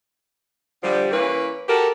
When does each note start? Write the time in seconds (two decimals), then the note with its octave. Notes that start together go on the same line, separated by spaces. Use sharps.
0.84 D3 F3 G3
1.12 E3 A#3 C#4 E4 B4
1.69 F#4 G4 A4 A#4